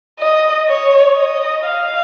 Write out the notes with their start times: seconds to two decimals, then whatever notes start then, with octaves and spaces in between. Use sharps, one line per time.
0.20 D#5
0.68 C#5
1.16 D#5
1.64 F5